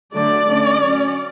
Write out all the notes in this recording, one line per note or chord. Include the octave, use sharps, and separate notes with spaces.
D3 F#3 A3 D5
D3 A3 C#4
F#3 C#4